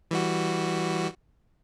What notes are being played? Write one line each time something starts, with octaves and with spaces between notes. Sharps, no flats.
E3 G3 F#4